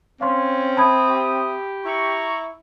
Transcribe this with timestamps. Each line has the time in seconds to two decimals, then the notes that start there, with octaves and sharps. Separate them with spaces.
0.21 C4 C#4 F5 C6
0.77 E5 A5 B5 D#6 G#6
1.09 G4
1.85 E4 A#5 C#6